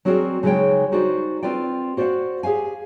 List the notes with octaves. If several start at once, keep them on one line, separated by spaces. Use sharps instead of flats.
F#3 C4 F#4 G#4 A#4 D5
C#3 F#3 G#3 D#4 C#5 G5
D#4 F#4 G#4 C5 D5
C4 F4 B4 D5 G5
F#4 C5 D5 D#5 F5 F#5
G4 G#4 C5 F5 G#5